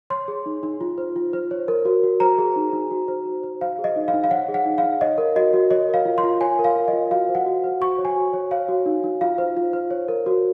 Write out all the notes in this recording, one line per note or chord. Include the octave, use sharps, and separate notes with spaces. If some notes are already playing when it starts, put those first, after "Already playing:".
C#5 C6
G#4
D#4
D#4
F4
C5
F4
C5
C#5
A#4
F#4
F#4
C5 A#5
G#4
D#4
D#4
F#4
C5
F#4
C5
C5 F5
G#4
D#5
D#4
F5
D#4
F5
C#5 F#5
G#4
F#5
D#4
F5
D#4
C#5 D#5
A#4
F#4 D#5
F#4
C#5 D#5
A#4
F5
F4
C6
F4
C#5 G#5
A#4
F5
F4
D#5
F4
F#4 F5
C5
F#5
F#4
C5
F#4 C#6
C#5
G#5
F#4
C#5
C#5 F5
F#4
D#4
D#4
F4 F5
C5
F4
C5
C#5
A#4
F#4